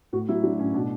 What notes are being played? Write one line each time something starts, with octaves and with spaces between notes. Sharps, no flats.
A2 F#4
F#3 E4
F#3 D4
A2 C#4
B2 D4